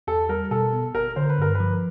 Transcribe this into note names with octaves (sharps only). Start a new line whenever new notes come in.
E2 A4
G3 A#4
B2 A4
B3
G#1 A#4
D3 C5
B4
G2 A#4
B4
F3